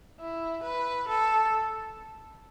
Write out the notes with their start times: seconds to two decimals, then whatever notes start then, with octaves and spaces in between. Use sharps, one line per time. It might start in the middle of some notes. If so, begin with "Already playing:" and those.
0.20 E4
0.63 B4
1.08 A4